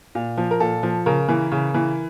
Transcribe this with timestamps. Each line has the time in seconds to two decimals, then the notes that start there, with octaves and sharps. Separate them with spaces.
0.15 A#2
0.38 F3
0.51 A#4
0.60 A#2 A4
0.83 F3
1.06 C#3 A#4
1.28 E3
1.52 C#3
1.74 E3